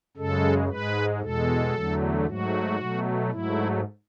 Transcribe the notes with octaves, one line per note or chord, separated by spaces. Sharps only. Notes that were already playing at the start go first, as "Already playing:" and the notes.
F#2 C#3 G#3 A4
G#2 G#3 B4
E2 B2 G#3 A4
E2 D3 F#3 A3
G#2 F#3 A3 F#4
B2 F#3 A3
G#2 F#3 A3 E4